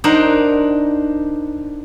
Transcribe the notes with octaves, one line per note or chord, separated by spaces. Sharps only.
D4 D#4 A#4 C5 F#5